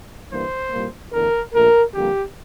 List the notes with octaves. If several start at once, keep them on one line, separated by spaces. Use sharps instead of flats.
G2 E3 G3 A#3 C5
C2 A#2 G3 A#3
E2 D3 A3 A#4
A#1 A#2 A3 A#4
F2 D3 G3 A#3 G4